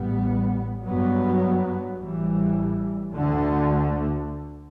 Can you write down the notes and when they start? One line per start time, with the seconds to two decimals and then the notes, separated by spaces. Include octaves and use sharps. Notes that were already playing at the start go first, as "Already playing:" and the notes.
Already playing: A1 A2 G3 B3
0.85 G2 F#3 B3
1.99 A1 A2 E3 G3
3.12 D2 D3 A3